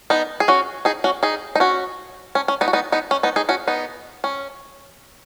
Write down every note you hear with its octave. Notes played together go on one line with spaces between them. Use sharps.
B3 D#4
G#4
C#4 F#4
D#4 G#4
C#4 F#4
D#4 G#4
D#4
C#4 F#4
C#4
C#4
B3 D#4
F#4
B3 D#4
B3 D#4
C#4
B3 D#4
D#4 G#4
C#4 F#4
B3 D#4
C#4